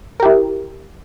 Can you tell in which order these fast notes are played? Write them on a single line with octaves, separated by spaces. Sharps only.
A#4 G4 E4